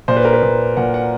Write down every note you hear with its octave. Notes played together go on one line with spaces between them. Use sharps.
A#2 C5
B4
A#4
B4
A#2
A#2 F#5
F#5